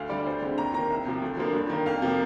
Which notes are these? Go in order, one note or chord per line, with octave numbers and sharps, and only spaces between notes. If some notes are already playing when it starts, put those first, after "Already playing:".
Already playing: D2 F5
D3 G3 D5
D2 C5
D3 G#3 C4
D#2 A#5
D#3 A#3 A#5
C2
C3 F3
D2
D3 F3 A#3
G2
D#3 A#3
F2 F5
C3 F3 A#3